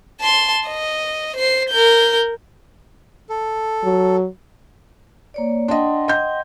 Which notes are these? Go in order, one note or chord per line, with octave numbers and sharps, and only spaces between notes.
A5 C6
D#5
C5 C7
A#4 G6
A4
F#3
A#3 C#5 D5
D4 D#5 F#5 G5 C6
D#5 G6